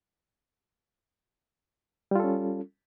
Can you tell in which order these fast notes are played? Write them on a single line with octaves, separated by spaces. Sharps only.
G3 F4 A4 C#4